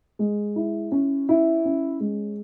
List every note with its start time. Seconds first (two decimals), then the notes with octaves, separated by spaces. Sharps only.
0.19 G#3
0.56 E4
0.92 C#4
1.29 E4
1.65 C#4
2.00 G#3